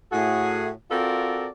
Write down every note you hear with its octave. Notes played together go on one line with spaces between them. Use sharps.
A2 F#4 G#4
C4 F4 F#4 A4 A#4 D5